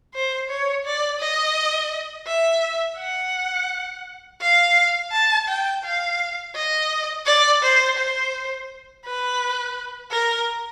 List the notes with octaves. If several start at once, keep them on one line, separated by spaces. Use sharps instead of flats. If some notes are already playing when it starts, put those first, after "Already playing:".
C5
C#5
D5
D#5
E5
F#5
F5
A5
G5
F5
D#5
D5
C5
C5
B4
A#4